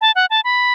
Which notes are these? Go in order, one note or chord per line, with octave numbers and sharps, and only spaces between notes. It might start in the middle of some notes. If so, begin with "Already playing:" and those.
A5
F#5
A5
B5